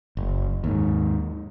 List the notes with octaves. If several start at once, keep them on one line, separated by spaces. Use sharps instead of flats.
F#1
D#2 G#2